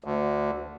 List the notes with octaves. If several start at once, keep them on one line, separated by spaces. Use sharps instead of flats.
D2